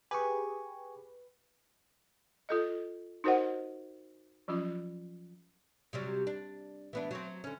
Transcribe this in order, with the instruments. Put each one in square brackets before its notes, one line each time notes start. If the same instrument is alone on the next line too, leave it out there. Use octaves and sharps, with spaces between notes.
[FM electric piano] G4 G#4 [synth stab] B4 [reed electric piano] G#5 C#6
[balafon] F4 A4 D#5
D#4 F#4 A#4 C5 D#5 F#5
F3 F#3 C#4 F4
[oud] C3 F#3 G3
D4
E3 B3 D4
F#3 C4
D3 C#4